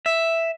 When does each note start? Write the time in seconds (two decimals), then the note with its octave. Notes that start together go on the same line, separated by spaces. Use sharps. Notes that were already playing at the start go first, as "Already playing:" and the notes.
0.06 E5